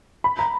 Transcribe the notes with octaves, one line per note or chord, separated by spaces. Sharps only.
B5
A#5